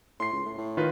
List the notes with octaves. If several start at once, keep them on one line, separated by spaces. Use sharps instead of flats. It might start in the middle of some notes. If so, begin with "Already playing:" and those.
A2 C6 C7
C#2
A2
A2
D#3 F4 B4